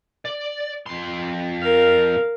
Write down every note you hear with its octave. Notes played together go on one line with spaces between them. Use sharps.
D5
F2 C6
A#4 F5